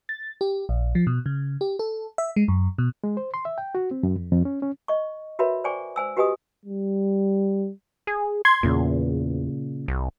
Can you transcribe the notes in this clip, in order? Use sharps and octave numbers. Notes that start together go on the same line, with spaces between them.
A6
G4
A#1
F3
B2
C#3
G4
A4
E5
G#3
F#2
B2
G#3
C5
C6
E5
G5
F#4
C4
F#2
F2
F2
C#4
C#4
D#5 C#6
F#4 A#4 B4 C#5 E5 B5
C5 D5 G5 G#5 C#6 D6
C5 G#5 E6
F#4 G4 B4 D#5 G#5 D#6
G3
G#4
C6 G#6
E2 A#2 C#3
C2